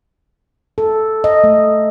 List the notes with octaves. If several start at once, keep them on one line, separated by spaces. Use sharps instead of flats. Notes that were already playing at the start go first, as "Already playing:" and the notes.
A4
D#5
A3